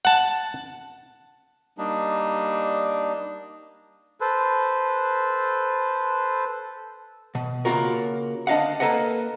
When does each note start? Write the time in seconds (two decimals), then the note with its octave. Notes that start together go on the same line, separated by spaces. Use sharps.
0.05 F#5 A5
1.78 G3 A#3 D4 D#4
4.21 A4 B4 C5
7.35 B2
7.65 C#3 A#3 C#4 F4 F#4 A#4
8.47 D2 D4 D#5 F5 F#5
8.80 A#3 A4 B4 D#5 F#5